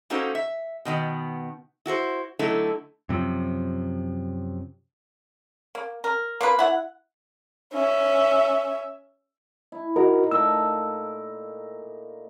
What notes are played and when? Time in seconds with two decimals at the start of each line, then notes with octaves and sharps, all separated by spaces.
0.10 A#3 C#4 D#4 F#4 A4 C5
0.35 E5
0.85 B2 D#3 B3
1.86 E4 F#4 A4 C5
2.39 D3 F#3 A3 D#4 E4 A4
3.09 F#2 C3 F3
5.75 A#3
6.04 A#4
6.41 A#3 F4 B4
6.59 E4 F#5
7.74 C#4 E5
9.72 E4
9.96 D#4 F#4 A#4
10.31 A#2 A3 A#4 E6